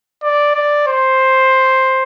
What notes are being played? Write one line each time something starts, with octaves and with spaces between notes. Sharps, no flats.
D5
D5
C5